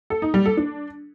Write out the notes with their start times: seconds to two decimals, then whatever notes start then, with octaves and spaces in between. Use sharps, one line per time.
0.10 A4
0.22 D#4
0.34 G3
0.46 A4
0.57 D4